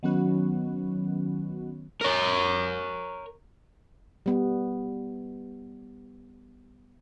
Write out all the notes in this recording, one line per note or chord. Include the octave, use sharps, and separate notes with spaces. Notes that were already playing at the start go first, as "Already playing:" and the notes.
D#3 F#3 B3 C#4 F#4
A#4 C#5
G3 B3